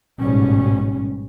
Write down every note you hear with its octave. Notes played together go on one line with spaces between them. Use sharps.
A1 G#2 B2 G3 C#4